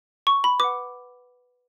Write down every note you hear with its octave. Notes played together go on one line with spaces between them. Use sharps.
C#6
B5
B4 F#5 D6